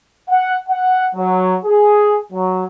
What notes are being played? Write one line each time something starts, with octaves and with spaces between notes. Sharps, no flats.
F#5
F#5
F#3
G#4
F#3